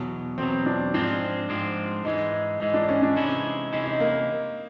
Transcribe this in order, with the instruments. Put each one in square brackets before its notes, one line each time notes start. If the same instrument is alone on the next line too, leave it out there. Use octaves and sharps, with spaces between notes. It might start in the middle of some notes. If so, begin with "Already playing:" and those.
Already playing: [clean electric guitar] E2 B2 F#3
[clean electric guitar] E2 B2 F#3 [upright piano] C4
[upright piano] D4
[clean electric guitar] G#2 F3 G#3 C4 [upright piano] D4
[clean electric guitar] G#2 F3 G#3 C4
[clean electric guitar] G#2 E3 G#3 [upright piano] D#4
[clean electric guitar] G#2 E3 G#3 [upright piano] D#4
[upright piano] D4
C#4
D4
[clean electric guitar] C3 E3 G#3 C#4 E4 [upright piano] D#4
[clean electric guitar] C3 E3 G#3 C#4 E4 [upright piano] D#4
[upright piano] D#4
A#3